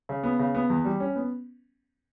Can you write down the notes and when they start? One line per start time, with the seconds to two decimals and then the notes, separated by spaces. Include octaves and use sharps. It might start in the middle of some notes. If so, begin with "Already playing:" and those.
0.09 C#3
0.23 B3
0.39 C#3
0.55 B3
0.70 E2
0.84 G3
1.00 C#4
1.16 B3